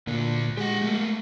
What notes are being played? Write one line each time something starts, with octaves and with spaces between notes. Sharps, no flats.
D2 A#2 D3
G#3 G4 F#5
A3 A#3